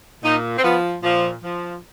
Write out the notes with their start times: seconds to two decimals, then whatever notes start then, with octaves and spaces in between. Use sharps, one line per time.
0.23 A#2 D#4
0.58 C4
0.64 F3 B3
1.03 A#2 F3
1.43 F3